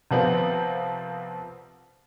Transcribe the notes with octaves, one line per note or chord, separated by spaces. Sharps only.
C2 F3 B3 C4